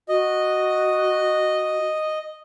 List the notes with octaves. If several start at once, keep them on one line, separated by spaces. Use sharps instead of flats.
F#4 D#5